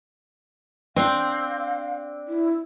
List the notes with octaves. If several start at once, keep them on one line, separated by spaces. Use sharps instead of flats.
C4 D4 F5 G5
E4